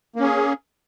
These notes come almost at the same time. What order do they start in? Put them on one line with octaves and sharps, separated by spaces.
A#3 C#4 G#4